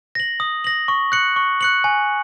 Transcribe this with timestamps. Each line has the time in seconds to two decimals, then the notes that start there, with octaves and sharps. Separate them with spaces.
0.15 A#6 F#7
0.40 D#6
0.64 A#6 F#7
0.88 C#6
1.12 F#6 C#7 F#7
1.36 C#6
1.61 F#6 C#7 F#7
1.84 G#5